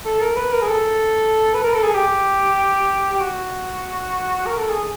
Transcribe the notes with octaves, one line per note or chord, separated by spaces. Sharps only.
A4
A#4
B4
A#4
G#4
A4
B4
A#4
A4
G#4
G4
G4
F#4
A#4
A4
G#4